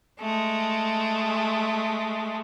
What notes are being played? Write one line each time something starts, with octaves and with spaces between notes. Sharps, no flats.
G#3 A3